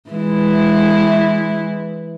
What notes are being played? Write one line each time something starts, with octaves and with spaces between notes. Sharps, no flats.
E3 G#3 E4